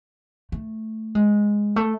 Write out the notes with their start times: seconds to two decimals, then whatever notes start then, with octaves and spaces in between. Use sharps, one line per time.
0.52 A3
1.15 G#3
1.76 A3